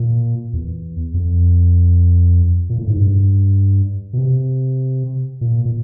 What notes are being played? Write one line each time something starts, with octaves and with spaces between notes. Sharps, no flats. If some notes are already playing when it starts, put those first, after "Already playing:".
Already playing: A#2
E2
F2
A#2
A2
G#2
G2
B2
C3
A#2
A#2